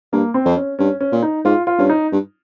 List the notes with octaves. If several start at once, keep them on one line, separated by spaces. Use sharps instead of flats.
G2 A#3
C4
F2
C#4
G2 C#4
C#4
A#2
D#4
G#2 F4
F4
G2 C#4
D#4
G2